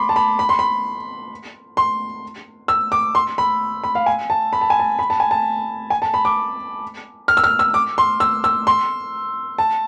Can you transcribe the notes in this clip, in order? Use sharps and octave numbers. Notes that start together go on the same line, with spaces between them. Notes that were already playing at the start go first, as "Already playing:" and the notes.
Already playing: B5 C6 D6
A5
B5
B5
C6
B5
C6
E6
D6
C6
B5
B5
F5
G#5
A5
B5
A5
G#5
A5
B5
A5
G#5
A5
G#5
A5
B5
D6
F6
E6
F6
E6
D6
C6
E6
E6
C6
A5